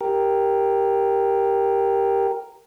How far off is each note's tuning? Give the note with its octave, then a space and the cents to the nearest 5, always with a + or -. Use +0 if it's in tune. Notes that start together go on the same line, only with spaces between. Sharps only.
G4 +0 A#4 +0